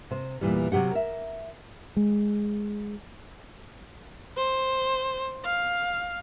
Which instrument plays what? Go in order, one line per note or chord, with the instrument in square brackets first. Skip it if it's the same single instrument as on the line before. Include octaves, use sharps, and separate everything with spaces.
[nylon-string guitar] C3 C5
E2 A#2 E3 G3
C3 F#3 G4 F#5
A#4 E5
[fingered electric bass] G#3
[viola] C5
F5